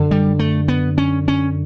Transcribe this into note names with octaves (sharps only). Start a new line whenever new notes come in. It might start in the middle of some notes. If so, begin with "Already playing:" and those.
Already playing: F#2 D3
G3
A3
B3
C#4
C#4